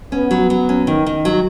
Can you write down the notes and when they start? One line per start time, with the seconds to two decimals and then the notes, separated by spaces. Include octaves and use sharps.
0.12 B3 C#4
0.31 F#3
0.50 F#3
0.69 C#4
0.87 D#3
1.06 D#3
1.25 F#3